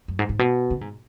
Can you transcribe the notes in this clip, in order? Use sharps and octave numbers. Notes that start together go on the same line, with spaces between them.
F#2
G#2
G#2
B2
C#3
G#2